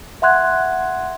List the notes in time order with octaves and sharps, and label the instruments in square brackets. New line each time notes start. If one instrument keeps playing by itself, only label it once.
[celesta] E5 F#5 C6 F#6 G#6